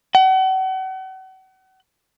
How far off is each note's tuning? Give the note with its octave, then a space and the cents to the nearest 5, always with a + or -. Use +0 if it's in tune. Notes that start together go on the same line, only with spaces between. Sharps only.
F#5 +40